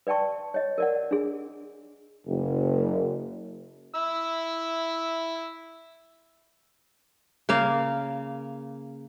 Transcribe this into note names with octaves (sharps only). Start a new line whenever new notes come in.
B4 D5 G5 A5 C#6
C#5 D#5
A#4 D5 F#5
D4 G#4
F#1
E4 E6
C#3 A#3 F5